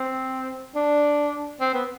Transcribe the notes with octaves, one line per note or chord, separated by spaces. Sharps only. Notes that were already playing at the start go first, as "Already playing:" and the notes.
Already playing: C4
D4
C4
B3